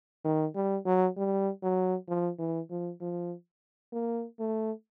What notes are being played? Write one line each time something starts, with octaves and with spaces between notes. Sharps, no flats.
D#3
G3
F#3
G3
F#3
F3
E3
F3
F3
A#3
A3